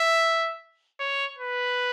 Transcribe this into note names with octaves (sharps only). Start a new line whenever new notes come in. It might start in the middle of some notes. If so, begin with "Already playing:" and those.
Already playing: E5
C#5
B4